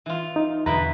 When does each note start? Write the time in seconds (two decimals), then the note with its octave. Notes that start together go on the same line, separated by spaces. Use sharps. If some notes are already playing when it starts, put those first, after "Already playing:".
0.06 E3 F4
0.36 D#4
0.66 E2 B2 D3 E4 B4 A#5